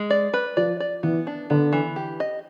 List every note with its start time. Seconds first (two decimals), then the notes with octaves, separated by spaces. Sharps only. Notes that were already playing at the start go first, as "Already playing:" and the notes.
Already playing: G#3
0.10 D5
0.34 B4
0.57 F3 D5
0.80 D5
1.03 E3 B3
1.27 D4
1.50 D3 B3
1.73 E3
1.96 G4
2.20 D#5